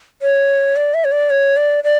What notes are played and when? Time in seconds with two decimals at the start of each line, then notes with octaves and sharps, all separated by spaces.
0.22 C#5
0.76 D5
0.94 E5
1.05 C#5
1.12 D5
1.30 C#5
1.57 D5
1.84 D5